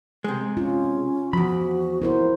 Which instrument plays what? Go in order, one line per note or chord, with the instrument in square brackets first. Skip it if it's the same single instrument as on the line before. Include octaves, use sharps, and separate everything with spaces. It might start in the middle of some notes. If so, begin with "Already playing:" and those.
[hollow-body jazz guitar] C3 G#3
[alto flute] C#4 [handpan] F4
[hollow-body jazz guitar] E2 B5 [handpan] F3 [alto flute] F#4
[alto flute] B3 [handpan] E4 A#4 C5